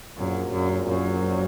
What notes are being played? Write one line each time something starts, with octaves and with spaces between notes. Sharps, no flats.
A#1 F#2 A#2 F#3
F#2
F#2